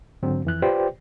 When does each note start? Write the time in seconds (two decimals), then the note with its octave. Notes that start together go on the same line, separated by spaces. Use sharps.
0.23 G#2 D3 F#3 C4
0.45 F2 E3 F#6
0.62 F4 G4 B4 C5 D5 G5